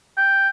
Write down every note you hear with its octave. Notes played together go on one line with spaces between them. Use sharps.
G5